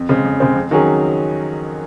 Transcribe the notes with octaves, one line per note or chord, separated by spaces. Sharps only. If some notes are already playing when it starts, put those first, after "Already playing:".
Already playing: F2
C#3 G#3 C4
F2
C#3 G#3 C4
F2
D#3 F#3 C#4 G#4